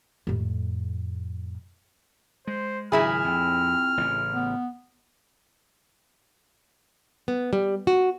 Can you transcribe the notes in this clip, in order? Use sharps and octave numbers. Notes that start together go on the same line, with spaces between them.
F2 A2
G#3 C5
G#1 A#2 C#3 F#3 E4 G#4 B5 F6
F2 F3 C4
A1 A2 C#3
B3
B3
G3
F#4